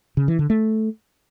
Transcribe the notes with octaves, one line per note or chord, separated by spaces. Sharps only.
C#3
E3
D3
A3